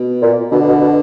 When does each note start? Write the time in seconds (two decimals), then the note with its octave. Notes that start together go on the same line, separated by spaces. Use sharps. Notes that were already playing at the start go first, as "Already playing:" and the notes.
Already playing: B2
0.22 A#2
0.52 B2 D3
0.67 B2
0.81 B2